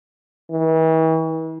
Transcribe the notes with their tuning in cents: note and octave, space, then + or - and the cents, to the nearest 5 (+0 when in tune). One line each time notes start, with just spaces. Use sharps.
E3 -40